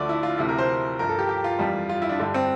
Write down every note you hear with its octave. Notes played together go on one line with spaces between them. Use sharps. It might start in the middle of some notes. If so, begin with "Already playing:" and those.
Already playing: D2 D3 F3 D5 E5
E4
F4
D2 C3 F3 E4
A#4
C5
G2 F3 A#4
A4
G4
G4
F4
F2 E3 G3
F4
E4
D4
G2 D3 G3
C4